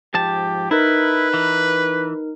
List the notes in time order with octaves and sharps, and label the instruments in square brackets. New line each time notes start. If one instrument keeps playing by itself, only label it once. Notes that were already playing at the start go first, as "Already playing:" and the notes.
[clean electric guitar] G#2 F3 A5 [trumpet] G4
[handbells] D#4 A#4 [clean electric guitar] E4 [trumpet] B4
[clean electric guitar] E3